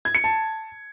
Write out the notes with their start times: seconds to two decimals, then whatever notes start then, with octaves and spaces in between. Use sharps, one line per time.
0.05 G#6
0.15 C#7
0.24 A5